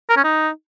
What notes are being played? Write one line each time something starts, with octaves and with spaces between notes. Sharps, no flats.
A#4
C#4
D#4